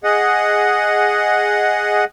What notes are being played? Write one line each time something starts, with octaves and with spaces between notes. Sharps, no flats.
G#4 D#5 F#5